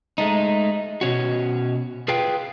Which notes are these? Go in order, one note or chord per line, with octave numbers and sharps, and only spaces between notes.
G#3 A3 D#4
B2 C#4 F#4
F4 G#4 B4 F5 G5